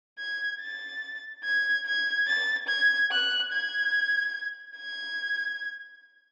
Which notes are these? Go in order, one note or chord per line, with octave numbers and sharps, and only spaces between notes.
G#6
A6
G#6
G#6
A6
G#6
F#6
G#6
G#6